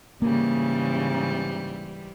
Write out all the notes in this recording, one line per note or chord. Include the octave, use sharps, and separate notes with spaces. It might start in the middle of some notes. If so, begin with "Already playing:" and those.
G#2 C#3 E3 G3 A#3